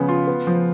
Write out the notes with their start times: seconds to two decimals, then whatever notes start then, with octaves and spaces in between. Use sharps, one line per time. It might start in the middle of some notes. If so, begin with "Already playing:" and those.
Already playing: C#3 F3 B3
0.09 F4
0.27 B3
0.47 F3